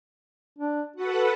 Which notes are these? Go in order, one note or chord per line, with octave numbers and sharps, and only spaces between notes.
D4
F#4 A4 B4 F#5